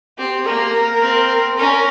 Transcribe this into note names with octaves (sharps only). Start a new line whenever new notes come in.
C4 G4
A#3 A#4
C4
C#4 A#4